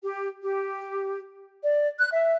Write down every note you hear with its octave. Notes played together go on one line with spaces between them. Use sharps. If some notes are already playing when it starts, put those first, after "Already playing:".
G4
G4
D5
F#6
E5